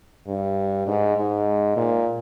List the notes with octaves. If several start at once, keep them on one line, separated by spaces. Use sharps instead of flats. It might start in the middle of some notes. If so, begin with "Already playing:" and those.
G2
G#2
G#2
A#2